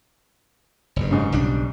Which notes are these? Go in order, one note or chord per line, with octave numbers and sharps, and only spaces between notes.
F#1 G2
G#2 C#3
B1 G3 D4